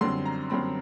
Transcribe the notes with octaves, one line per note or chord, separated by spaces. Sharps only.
F#2 D3 G3 C4 C6
A#5
F#2 D3 G3 C4 B5